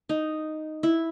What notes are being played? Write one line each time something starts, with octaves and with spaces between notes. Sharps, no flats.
D#4
E4